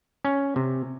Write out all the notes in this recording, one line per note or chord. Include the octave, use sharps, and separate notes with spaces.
C#4
C3